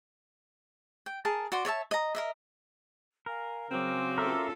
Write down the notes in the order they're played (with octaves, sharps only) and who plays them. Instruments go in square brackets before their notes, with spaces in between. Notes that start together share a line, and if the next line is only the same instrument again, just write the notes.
[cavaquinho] G5
G#4 A#4 A5
F#4 D5 C6
C#5 D5 E5 A5
D#5 A#5
A#4 D#5 E5
[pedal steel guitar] A#4 [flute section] F5 G#5
[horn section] C#3 C4 [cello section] F#3 [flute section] F#4 C6 D6
[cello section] C#4 F4 A4 [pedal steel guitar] A#4 E5